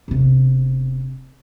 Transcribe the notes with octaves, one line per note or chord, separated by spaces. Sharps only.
E1 C3